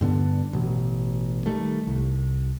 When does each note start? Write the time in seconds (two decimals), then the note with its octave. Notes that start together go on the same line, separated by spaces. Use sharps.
0.01 G2 D3 B3 D4
0.53 A1 B2
1.46 D#3 G3 A3
1.87 C2